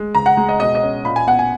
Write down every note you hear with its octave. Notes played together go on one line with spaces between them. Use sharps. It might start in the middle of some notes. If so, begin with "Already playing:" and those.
Already playing: G#3
C#2 A#5
F#5
G#3
D#5
B2 D#5
D#5
C#4
A#2 B5
G#5
B3 F#5
G#5